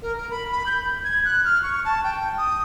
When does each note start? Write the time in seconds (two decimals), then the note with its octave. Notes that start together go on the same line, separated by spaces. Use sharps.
0.02 A#4
0.17 A#4
0.31 B5
0.52 B5
0.66 G6
1.04 G#6
1.25 F#6
1.45 F6
1.63 C#6
1.85 A5
2.04 G5
2.37 D#6